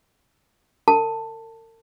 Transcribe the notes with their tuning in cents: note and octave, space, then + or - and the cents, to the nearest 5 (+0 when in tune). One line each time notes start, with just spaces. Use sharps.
A#4 -45 A5 +10